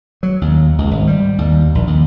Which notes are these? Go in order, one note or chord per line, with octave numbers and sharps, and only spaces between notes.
F#3
D#2
C#2
G#1
G3
D#2
A#1
D#2